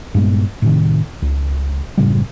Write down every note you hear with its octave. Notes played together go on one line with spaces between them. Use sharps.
G2 A#2 G#3 B3
A2 C3 D#3
C#2
F#1 A2 C#3 G3